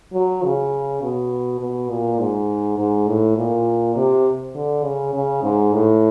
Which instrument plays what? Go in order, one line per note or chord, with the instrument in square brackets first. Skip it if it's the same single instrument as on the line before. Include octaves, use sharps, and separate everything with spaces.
[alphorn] F#3
C#3
B2
B2
A#2
G#2
G#2
A2
A#2
C3
D3
C#3
C#3
G#2
A2